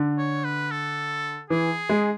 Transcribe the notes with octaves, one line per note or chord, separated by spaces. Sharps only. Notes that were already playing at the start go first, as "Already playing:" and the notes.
Already playing: D3
C#5
B4
A4
E3 G#4
G#3